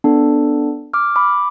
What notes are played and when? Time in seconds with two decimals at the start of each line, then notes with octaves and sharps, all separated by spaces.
0.04 B3 D4 A4
0.93 D6 F6
1.16 B5 D6